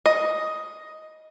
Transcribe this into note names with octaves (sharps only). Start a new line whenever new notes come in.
D#5